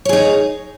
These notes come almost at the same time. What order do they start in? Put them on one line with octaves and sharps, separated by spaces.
C#5 G#4 D#4